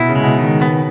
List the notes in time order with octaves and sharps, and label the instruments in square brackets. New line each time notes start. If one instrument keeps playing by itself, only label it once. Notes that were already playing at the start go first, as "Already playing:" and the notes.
Already playing: [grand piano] B2 [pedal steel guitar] E4
[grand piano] C#3
[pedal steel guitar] G#3
[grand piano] B2
[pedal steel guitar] D#3
B3